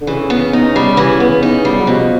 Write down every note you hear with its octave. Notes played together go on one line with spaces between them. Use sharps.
D3
C#3 E3
B3
D#4
G3
E3
B3
D#4
G3
F#3
B2 F3